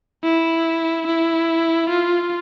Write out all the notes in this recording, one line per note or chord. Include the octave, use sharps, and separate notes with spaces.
E4
E4
F4